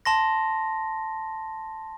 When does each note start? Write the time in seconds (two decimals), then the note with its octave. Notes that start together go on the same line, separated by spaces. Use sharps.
0.05 A5 C6 A#6